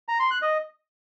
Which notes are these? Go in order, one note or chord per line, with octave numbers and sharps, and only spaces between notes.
A#5
C6
F#6
D#5